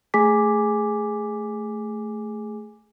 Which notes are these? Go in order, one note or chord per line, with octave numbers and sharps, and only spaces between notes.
A3 G#4 G#5 D6 B6